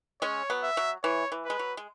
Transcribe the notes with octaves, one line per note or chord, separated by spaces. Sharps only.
G#3 C#4 C#5
F#3 B3
E5
F#3
E3 C#5
E3
G#3 B4
F#3
G#3